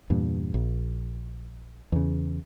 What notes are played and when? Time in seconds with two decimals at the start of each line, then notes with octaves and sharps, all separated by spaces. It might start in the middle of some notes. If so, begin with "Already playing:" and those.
0.10 E2 G2 A#2
0.54 A#1
1.92 E2 C#3